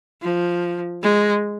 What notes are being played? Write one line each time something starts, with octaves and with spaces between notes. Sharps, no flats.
F3
G#3